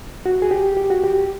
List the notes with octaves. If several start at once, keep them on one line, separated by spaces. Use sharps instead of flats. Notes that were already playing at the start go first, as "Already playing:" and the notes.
F#4
G#4
G4
G4
F#4
G4